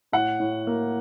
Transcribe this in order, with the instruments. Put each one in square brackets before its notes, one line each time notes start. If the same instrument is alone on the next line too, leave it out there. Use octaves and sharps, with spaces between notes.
[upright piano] A2 F#5
A2
A#3